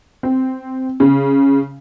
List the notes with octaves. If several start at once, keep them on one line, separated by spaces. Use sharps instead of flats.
C4
C#3